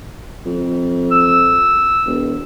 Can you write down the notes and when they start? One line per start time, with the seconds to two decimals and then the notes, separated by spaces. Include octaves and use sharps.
0.46 F2
1.12 E6
2.06 E1